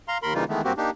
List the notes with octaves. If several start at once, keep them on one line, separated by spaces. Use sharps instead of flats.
F5 A#5 C6
D#2 A#4 B5 C6
C#3 E3 G3 A#3 D#4 F4
D#3 E3 G#3 A3 B3
G2 A#3 C4 F#4 G4
A#3 D4 D#4 G4